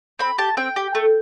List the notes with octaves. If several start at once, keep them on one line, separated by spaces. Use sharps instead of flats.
C4 B5
G4 A5
C4 G5
G4
A3